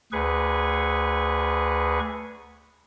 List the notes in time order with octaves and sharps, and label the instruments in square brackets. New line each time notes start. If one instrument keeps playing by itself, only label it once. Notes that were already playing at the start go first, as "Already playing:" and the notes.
[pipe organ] D2 G#4 B4 C#6